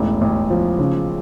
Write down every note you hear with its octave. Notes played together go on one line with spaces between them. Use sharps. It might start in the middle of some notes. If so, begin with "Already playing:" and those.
Already playing: E1 A1
A1
F3
C#3